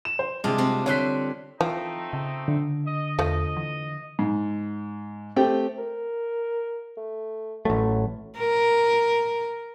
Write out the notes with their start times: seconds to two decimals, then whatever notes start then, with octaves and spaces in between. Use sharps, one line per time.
0.05 E7
0.19 C5
0.44 C3 G#3 D4 F4 G#4
0.58 G3 C4
0.86 D3 C5 C#5 C6 F#6 B6
1.61 E3 F3 A3 C4 D#4
2.13 C#3
2.48 D3
2.86 D#5
3.19 E2 F3 A3
3.57 E3
4.19 G#2
5.36 A3 C4 G4 G5
5.78 A#4
6.97 A3
7.65 A1 F#3 A3
8.38 A#4